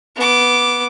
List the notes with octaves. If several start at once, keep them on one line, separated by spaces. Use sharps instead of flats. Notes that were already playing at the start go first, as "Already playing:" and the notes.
B3 D6